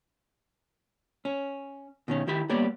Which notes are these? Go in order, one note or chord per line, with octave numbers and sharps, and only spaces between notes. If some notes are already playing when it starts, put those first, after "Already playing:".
C#4
B2 D#3 C#4
D#3 E4 G4 B5
G3 A#3 B3 C#5 D5